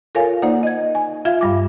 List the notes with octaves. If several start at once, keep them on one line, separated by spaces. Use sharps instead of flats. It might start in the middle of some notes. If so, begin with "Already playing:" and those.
F4 A4 A#4 C#5 F5 G#5
A#3 D#4 C5 D5 F#5
D#5 G#6
G#5
F4 E5 F5 G#6
G2 G3 D6